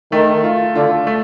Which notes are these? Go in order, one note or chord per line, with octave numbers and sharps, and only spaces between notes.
D#3 A3
F4
D3 F4
A3